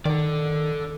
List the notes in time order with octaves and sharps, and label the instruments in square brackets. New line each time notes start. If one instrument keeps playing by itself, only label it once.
[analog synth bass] D#3 [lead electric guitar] A4 D5